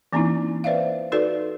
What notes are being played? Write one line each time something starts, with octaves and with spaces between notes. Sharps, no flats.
E3 A#3 C4 C#4 D#4 E4
B4 C5 D5 E5 F5
D#4 F#4 A4 B4 D5